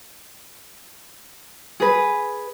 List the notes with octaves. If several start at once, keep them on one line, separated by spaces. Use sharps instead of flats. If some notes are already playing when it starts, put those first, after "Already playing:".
G#4 B4